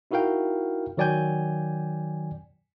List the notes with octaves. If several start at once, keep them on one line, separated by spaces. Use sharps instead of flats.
D#4 E4 F#4 A#4 F5 G5
D#3 F#3 D5 G5 G#5 G6